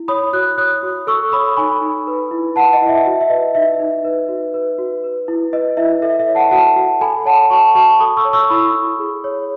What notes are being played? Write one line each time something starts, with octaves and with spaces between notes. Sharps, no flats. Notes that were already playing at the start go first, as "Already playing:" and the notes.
Already playing: E4
C#5 B5 D#6
F#4 D#6 F#6
C#5 D#6 F#6
F#4
A4 C#6 E6
C#5 B5 D#6
D#4 G#5 B5
D#4
B4
E4
B4 F#5 A5
D#5 F#5
E4
E5
F#4 E5
E5
B4 D#5
D#4 E5
D#4
B4
F#4
B4
F#4
B4
E4
B4 D#5
E4 E5
A4 E5
E5
C#5
F#5 A5
F#4 F#5 A5
F#4
A4 G#5 B5
C#5 F#5 A5
F#4 A5 C#6
F#4 A5 C#6
A4 B5 D#6
C#6 E6
C#5
C#6 E6
E4 B5 D#6
E4
G#4
C#5